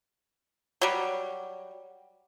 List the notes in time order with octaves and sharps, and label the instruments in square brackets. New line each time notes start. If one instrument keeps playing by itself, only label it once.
[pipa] F#3 G3